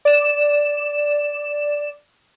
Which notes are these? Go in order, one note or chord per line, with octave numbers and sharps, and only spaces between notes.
D5 E7